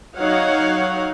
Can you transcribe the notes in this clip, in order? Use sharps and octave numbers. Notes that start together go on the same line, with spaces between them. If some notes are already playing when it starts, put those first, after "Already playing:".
F#3 D#4 C#5 F5 F#5